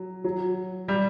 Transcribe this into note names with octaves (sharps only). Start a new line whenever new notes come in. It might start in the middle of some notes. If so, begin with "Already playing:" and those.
Already playing: F#3
F#3
G3